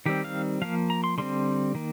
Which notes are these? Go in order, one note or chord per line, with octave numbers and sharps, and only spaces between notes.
D#3 G3 C4 G4
F5
F3 A#3 F5
A#5
C6
D3 G3 C4 C6
D#3 A#3